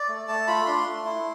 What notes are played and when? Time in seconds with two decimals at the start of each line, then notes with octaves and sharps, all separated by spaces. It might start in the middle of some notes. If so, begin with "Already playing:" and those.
Already playing: D5
0.09 A3
0.28 A3 A5
0.47 F4 B5
0.66 D4 C6
0.86 A3
1.05 E4